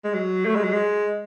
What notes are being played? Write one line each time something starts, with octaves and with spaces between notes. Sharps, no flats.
G#3
F#3
A3
G#3
F#3
G#3